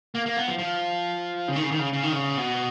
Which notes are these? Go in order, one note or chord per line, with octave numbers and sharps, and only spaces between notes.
A#3
A#3
B3
F3
F3
C#3
D#3
C#3
D#3
C#3
C#3
D#3
C#3
B2